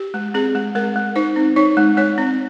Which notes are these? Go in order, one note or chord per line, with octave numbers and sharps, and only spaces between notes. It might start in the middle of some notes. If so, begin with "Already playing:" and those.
Already playing: G4
G#3
C4 G#4
G#3
G#3 A#4
G#3
D#4 C5
C4
D#4 C#5
G#3
G#3 C#5
C4